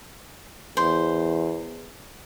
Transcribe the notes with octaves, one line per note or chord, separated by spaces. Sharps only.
E2 C5